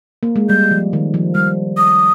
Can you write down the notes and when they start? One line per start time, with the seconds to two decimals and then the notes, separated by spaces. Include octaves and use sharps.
0.23 A#3
0.36 G#3
0.49 G3 G6
0.71 F3
0.93 D#3
1.14 F3
1.35 G3 F6
1.77 D#6